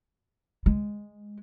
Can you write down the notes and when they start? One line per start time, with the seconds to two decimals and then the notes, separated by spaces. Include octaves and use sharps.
0.66 G#3